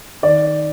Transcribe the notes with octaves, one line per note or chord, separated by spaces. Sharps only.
D#3 D5